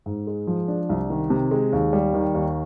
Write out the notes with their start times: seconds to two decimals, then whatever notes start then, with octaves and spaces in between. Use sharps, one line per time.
0.06 G#2
0.27 G#3
0.47 F3
0.68 D4
0.89 C2
1.10 D#3
1.30 C3
1.51 G#3
1.73 D#2
1.93 G3
2.14 D#3
2.35 D#2